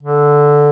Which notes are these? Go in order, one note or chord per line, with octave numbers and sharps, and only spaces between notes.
D3